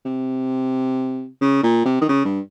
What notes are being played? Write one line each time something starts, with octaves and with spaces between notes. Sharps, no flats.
C3
C#3
A#2
C3
D#3
C#3
G2